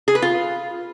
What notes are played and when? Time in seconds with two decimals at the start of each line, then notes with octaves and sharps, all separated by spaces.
0.08 G#4
0.15 B4
0.22 F4